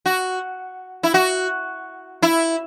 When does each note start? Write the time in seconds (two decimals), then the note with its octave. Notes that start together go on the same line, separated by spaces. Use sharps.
0.06 F#4
1.03 E4
1.14 F#4
2.23 E4